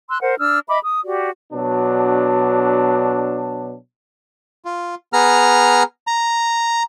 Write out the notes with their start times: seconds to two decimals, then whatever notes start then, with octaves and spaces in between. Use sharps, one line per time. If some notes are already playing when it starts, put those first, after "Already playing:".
0.10 C6 E6 F#6
0.21 A#4 C5 F#5
0.39 D4 E6 F6
0.68 D#5 E5 B5 D6
0.83 D#6
1.03 F#4 G4 D5
1.53 B2 F#3 D4
4.65 F4
5.13 B3 G#4 A#5 F6
6.07 A#5